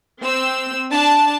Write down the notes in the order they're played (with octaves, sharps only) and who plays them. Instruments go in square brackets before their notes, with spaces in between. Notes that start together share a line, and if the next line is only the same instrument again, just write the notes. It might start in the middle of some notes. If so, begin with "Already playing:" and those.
[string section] C4 E6
D4 A5